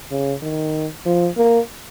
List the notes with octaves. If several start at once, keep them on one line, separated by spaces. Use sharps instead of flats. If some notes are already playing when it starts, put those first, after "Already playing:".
C#3
D#3
F3
A#3